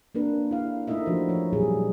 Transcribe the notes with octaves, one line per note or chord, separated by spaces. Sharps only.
A#3 C4 D4 A#4 B4
E4 F5
A3 D#4 E4 A#4 D#5 E5
F3 D4 F#4 C5
F3 C#5
A#2 F#3 G3 G#4